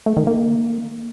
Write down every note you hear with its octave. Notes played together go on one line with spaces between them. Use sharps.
A3
D#3
A#3